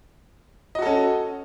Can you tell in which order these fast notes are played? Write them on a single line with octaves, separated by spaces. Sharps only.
D#5 F#4 A4 C#4